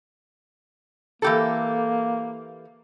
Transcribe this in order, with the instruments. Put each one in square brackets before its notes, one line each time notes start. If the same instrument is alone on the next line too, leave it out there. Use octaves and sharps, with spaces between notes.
[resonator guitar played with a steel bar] E3 G4 A4 [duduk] A#3